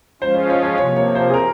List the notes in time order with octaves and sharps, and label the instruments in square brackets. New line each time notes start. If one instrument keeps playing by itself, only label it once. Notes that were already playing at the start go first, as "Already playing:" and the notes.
[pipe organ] F3 G#3 C#4 F4 [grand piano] C5
[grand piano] C5
C#5
C#5
[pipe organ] C3 F3 A#3 [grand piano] C#5
[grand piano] C#5
C5
G#4
A#4